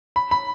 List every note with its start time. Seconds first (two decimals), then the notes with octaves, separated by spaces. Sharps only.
0.16 B5
0.31 B5